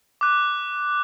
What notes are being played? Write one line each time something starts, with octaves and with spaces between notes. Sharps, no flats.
D6 F#6